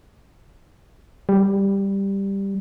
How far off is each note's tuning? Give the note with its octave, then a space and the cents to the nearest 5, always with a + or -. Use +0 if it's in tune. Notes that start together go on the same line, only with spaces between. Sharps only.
G3 +5